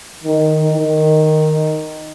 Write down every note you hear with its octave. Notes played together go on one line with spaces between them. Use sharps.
D#3
D#3